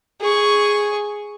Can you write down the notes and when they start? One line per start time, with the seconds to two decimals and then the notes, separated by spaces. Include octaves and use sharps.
0.20 G#4 C#6